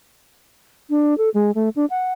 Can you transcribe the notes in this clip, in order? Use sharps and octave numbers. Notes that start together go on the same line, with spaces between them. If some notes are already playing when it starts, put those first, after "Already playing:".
D4
A4
G#3
A3
D4
F#5